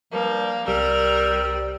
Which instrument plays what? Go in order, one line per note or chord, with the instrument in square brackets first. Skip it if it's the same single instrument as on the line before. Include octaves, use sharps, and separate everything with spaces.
[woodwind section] G2 F3 G3 [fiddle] A#3
[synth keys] C2 [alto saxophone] G3 [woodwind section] C4 D5 E6 [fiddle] A#4